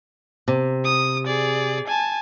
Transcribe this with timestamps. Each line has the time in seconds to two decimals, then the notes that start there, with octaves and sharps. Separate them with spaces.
0.48 C3
0.85 D#6
1.27 G#4 D5
1.88 G#5 A5